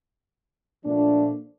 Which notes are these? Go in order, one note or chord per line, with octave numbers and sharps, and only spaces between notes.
A#2 F3 A3 D4